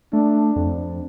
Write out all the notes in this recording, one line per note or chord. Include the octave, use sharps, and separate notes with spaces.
A3 D4
F2